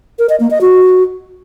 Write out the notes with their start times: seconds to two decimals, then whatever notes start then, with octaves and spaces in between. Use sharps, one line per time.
0.19 A#4
0.29 D#5
0.40 A#3
0.51 D#5
0.61 F#4